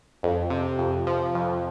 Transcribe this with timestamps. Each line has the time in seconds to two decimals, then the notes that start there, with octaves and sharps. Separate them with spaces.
0.23 F2
0.50 C3
0.79 F2
1.07 F3
1.35 F2